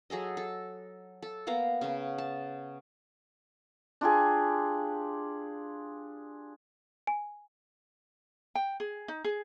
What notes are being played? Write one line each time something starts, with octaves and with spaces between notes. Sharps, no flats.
F#3 G#4 A4 D#5
A4
A4
A#3 B3 F5 A#5
C#3 B3
A5
D4 F4 G4 G#4
G#5
G5
G#4
D#4
G#4